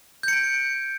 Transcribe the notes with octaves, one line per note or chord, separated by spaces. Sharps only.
G6 C#7 D7